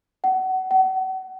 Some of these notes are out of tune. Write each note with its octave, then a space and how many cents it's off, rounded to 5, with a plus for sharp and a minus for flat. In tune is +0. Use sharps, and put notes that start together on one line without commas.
F#5 +25
F#5 +35